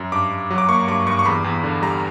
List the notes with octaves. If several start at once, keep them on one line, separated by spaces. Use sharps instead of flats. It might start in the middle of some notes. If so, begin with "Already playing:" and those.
Already playing: F#2
G2 D6
G2
F#3
D6
A#3 C#6
G2 D6
G2 C#6
C#6
E2 B5
E2
D3
G3 A#5